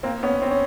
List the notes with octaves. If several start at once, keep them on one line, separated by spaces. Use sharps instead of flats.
A#3 C4
B3 C#4
C4
C#4